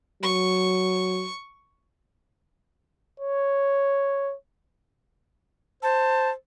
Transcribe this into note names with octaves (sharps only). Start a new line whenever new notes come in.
F#3 C#6
C#5
C5 A5